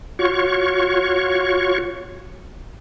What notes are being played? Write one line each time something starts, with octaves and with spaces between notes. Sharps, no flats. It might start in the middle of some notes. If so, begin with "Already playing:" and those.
F4 F#4 C#5 C#6